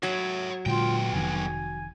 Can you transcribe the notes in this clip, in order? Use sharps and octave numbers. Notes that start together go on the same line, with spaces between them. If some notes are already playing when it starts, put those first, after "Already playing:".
F#3 C#5 E5
B1 A#2 D3 G#3 F4 G5
F1 F2 D#3 G#5